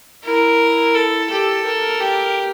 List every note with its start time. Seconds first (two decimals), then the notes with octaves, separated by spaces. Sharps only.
0.24 E4 A#4
0.95 A4
1.30 G4 A4
1.66 A#4
2.01 G4